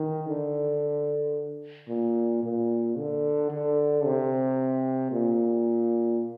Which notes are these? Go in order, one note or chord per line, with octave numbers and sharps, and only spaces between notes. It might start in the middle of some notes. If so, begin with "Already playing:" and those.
Already playing: D#3
D3
A#2
A#2
D3
D3
C3
A#2